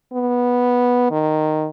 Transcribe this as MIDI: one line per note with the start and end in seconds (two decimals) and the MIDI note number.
0.13 1.07 59
1.11 1.68 51